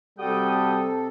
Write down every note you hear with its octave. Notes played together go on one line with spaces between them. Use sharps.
C3 G3 F#4 A4 G5 D#6